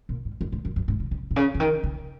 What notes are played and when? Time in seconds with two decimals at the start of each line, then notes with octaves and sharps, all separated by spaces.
0.09 A#2
0.25 G#2
0.41 F#2
0.52 G#2
0.65 F#2
0.76 F#2
0.88 G#2
1.00 C#3
1.11 C#3
1.31 A#2
1.36 C#3
1.54 C#3
1.60 D#3
1.83 C#3